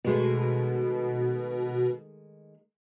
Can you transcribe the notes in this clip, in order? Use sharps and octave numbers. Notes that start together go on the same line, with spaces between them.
B2 D#3 G#3 A3